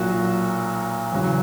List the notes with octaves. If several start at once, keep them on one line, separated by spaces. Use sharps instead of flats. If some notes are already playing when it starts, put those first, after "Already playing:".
Already playing: B1 A#2 F#3 F#4
E2 C#3 F#3